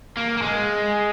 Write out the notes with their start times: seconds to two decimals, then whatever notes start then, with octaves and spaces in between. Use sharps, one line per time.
0.17 A#3
0.37 A#3
0.42 G#3